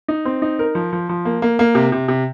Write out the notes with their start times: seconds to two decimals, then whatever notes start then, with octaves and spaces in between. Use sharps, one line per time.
0.08 D#4
0.25 C4
0.42 D#4
0.59 A#4
0.75 F3
0.93 F3
1.09 F3
1.25 A#3
1.42 A#3
1.59 A#3
1.75 C3
1.92 C3
2.08 C3